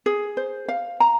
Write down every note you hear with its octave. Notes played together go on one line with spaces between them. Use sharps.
G#4
C5
F5
A#5